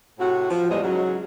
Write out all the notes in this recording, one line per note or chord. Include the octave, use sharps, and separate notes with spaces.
A2 C3 F#4
F3
E2 A2 G3 G#3 D#5
G#2 C#3 F#3